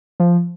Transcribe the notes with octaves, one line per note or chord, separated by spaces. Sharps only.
F3